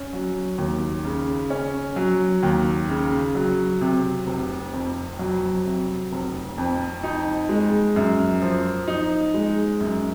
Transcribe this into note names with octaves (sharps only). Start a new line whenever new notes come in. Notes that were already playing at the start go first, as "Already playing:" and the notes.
Already playing: C#4
F#3
D#2
C#3
C#4
F#3
D#2
C#3
F#3
C3
F1
F2
F#3
C3
F1
F2
D#4
G#3
F#2
F3
D#4
G#3
F#2